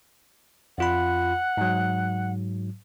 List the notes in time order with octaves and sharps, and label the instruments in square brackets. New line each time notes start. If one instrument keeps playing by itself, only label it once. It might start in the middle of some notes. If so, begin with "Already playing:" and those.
[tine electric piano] F2 F4 B5 [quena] F#5
[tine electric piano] G#2 F#3